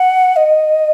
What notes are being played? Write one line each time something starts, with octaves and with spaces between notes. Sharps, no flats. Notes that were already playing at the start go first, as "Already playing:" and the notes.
Already playing: F#5
D#5